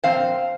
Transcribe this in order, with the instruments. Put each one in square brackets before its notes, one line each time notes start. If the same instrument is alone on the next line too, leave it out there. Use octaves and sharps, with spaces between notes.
[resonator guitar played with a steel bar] A#2 F3 C4 C5 F5